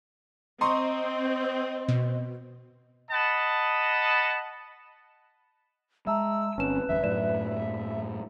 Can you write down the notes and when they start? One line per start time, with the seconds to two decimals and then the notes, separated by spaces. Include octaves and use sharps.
0.61 C4 D#5 A#5 C6 C#6 D#6
1.88 B2
3.11 D#5 F#5 A5 B5 D#6
6.07 G#3 E5 A5 A#5 E6
6.58 G1 C4 C#4 B4 A5 E7
6.89 G1 E2 G2 E5
7.03 F#2 A2 F#3 D5 E7